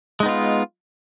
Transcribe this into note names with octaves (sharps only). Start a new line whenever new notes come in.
G#3 B3 D#4 F4